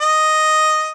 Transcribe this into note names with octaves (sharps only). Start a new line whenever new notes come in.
D#5